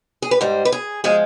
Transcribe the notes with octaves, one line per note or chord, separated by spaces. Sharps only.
G#4
B4
G#2 G3 C5
B4
G#4
F3 G#3 G#4